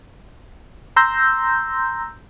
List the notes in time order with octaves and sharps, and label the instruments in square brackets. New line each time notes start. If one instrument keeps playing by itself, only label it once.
[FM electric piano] A#5 C6 E6 G6 A#6